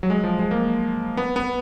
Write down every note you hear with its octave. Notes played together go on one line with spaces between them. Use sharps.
F#3
G#3
F3
G#3
A#3
B3
B3